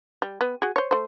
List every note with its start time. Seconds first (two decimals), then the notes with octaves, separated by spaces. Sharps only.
0.22 G3
0.41 B3
0.62 F#4 G#4
0.76 C5 C#5
0.91 A3 C5